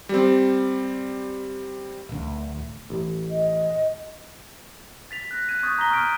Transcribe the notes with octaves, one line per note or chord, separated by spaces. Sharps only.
G3 C4
D1 D2
A1
D#5
A6 B6 F7
F#6 A#6
F#6 G#6 D#7
C#6 D#6 G6 A6
A#5 A#6 B6 G7
C#6 F6 G6 B6 D7 D#7